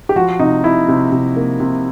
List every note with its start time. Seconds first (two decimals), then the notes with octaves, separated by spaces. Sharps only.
0.09 G4
0.16 F3 F#4
0.39 C3 D#4
0.64 C3 E4
0.88 C3
1.12 C3
1.37 A#3
1.60 C3